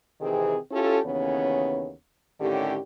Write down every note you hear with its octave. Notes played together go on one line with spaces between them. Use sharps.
C3 D#3 E3 C4 G#4
C#4 E4 F4 G4 A4
D#2 C#3 E3 B3 C#4 C#5
A2 D3 D#3 C#4 G4